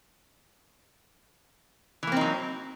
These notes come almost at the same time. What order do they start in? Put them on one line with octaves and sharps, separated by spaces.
E3 A#3 C4 D#4 F#3